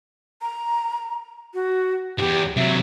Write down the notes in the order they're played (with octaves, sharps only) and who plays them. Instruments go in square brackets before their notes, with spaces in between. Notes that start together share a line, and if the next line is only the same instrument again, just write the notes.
[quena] A#5
F#4
[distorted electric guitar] E2 G#2 [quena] G4
[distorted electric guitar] C3 F#3 [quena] E5